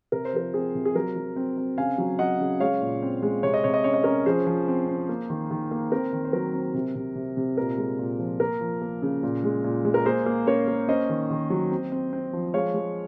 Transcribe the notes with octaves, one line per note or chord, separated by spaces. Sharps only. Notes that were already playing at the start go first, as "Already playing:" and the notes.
C3 A#4
C5
F3 A#4
C4 G#4
C3
G#4
F#3 A#4
F#3
C4
C4
C#3 F5 G#5
F#3
F#3 D#5 F#5
C#3
G#3 C#5 F5
A#2
C4
G#3
C3 C#5
D#5
C3 C#5
D#5
C#4 C#5
D#5
C#4 A#4 C#5
F3 G#4 C5
F3
C4
C4
A#3
D#3
D#3
A#3
C4 A#4
D#3
C5
F#3 A#4
C4
C3
C3
C3
C3
A#2 A#4
G#3
A#2
F3
A#3 A#4
F3
A#3
C#3
A#2
G#3
A#2
G#3
A#4
A#3 G#4 C5
A#3
C#4 A#4 C#5
A#3
C#4 C5 D#5
D#3
D#3
F#3
C4
C4
C4
F3
G#3 C#5 F5
G#3